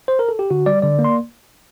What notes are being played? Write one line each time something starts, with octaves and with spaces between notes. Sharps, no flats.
C5
A#4
A4
G4
D3 F#4
G3 D5
D3 D5
A#3
C6